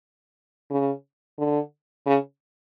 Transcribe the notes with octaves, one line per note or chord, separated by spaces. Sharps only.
C#3
D3
C#3